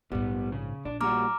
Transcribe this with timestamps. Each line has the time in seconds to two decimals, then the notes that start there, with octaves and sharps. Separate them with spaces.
0.12 A#1 G#2 G3 B3
0.52 C#3
0.85 A#1 D4
1.01 A#2 G3 F#4 A#5 D6 F6